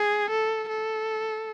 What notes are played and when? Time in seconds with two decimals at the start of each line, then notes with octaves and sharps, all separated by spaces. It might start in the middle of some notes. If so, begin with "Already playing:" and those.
Already playing: G#4
0.30 A4
0.69 A4